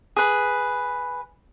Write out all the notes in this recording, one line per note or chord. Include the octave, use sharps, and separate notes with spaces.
G#4 B4